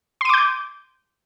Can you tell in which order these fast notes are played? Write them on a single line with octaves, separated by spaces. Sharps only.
C6 D#7 D6 G6